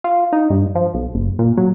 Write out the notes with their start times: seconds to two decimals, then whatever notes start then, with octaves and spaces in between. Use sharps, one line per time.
0.04 F4
0.33 D#4
0.50 G2
0.75 F3
0.94 B1
1.14 F#1
1.39 A#2
1.57 F#3